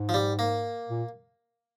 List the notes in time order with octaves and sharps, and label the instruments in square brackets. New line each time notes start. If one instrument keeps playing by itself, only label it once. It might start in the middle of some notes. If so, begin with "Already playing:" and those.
Already playing: [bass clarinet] G#2
[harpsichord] F3
G3
A#3
[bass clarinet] A#2